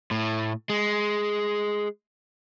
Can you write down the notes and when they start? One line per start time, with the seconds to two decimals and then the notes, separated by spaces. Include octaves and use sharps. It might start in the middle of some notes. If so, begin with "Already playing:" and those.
0.11 A2
0.70 G#3